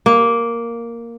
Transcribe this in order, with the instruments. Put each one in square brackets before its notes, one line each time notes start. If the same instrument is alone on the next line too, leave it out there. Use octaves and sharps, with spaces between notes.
[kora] A#3